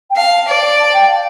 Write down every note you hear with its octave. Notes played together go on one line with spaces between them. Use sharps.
G5
F5 A5
D5
A5
G5
F5